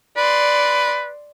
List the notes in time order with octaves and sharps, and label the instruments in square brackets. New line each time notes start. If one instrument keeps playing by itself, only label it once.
[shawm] B4 [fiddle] D5 C6